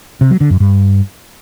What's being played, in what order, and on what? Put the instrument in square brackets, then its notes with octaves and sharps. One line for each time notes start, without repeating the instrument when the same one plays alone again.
[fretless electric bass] C3
F#3
D3
F#2
G2